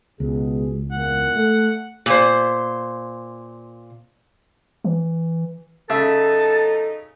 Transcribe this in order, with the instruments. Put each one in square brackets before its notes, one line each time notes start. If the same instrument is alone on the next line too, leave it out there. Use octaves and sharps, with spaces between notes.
[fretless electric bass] C#2 [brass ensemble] B2 G#4
[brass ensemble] E2 A#2 [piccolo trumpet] F#5
[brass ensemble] A3
[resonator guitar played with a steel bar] A#2 C5
[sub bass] E3
[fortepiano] C#3 E5 [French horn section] F#3 D#4 A4 [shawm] A5